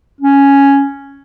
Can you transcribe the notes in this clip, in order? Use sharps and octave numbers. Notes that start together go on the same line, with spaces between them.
C#4